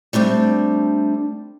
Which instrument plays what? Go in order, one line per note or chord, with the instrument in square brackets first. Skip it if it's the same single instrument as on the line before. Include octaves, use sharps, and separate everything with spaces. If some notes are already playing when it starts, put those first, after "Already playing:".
[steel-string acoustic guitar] G3 A3 C4 D4